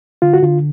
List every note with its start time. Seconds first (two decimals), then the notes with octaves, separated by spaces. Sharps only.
0.22 D3 F4
0.34 F#4
0.43 D3 F4